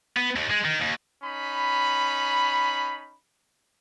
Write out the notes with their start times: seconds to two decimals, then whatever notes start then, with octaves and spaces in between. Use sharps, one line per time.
0.17 B3
0.36 D#2
0.50 G#3
0.64 D#3
0.80 D#2
1.23 C#4 D#4 B5